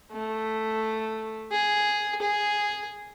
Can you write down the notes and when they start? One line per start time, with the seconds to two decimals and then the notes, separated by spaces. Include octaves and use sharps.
0.12 A3
1.51 G#4
2.21 G#4